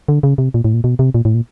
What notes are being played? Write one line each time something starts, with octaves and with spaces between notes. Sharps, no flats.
D3
C#3
C3
A#2
A2
A#2
B2
C3
A#2
A2
A#2